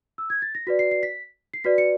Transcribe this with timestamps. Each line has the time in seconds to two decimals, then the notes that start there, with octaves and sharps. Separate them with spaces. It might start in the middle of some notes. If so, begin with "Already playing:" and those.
0.18 E6
0.30 G#6
0.42 A6
0.55 A#6
0.67 F#4 B4 D5 B6
0.79 C7
0.91 C7
1.03 B6
1.54 C7
1.64 F#4 B4 D5 B6
1.78 C#7